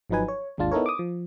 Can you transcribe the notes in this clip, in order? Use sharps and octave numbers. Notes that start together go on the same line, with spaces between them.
G#1 F3 F#3 D#4 B4 G#5
C#5
G#1 D#2 G#3 D4 F4 A5
B3 D#4 E4 A4 A#4 C#5
D6 D#6
F3